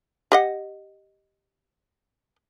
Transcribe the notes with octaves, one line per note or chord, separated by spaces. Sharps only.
G4 D#5 F#5